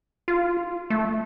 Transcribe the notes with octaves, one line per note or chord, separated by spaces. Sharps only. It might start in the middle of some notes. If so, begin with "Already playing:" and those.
F4
A3